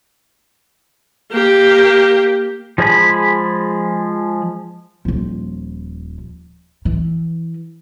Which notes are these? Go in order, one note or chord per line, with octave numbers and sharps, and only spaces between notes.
A#3 G4
F3 G#3 G#4 G#5 B5
D#1 F3
E3